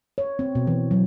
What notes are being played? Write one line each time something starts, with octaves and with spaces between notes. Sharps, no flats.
C#5
C4
B2
E3
F#3